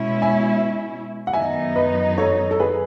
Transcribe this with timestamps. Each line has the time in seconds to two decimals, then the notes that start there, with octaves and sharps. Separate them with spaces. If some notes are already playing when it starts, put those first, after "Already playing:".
Already playing: B2 G#3 C#4 E4
0.22 E5 G#5
1.27 F#5
1.33 F#2 D#3 F#3 B3 D#4 E5 G#5
1.76 B4 D#5
2.18 A4 C#5
2.51 A4
2.60 G#4 B4